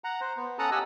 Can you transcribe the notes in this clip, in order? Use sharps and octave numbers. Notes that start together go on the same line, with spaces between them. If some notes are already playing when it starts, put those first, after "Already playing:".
F#5 A#5
C5
B3
C#4 A4 F#5 A5 A#5 D#6
G4 D#5 F#5 G#5 E6